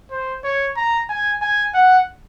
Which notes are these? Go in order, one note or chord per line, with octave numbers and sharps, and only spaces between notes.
C5
C#5
A#5
G#5
G#5
F#5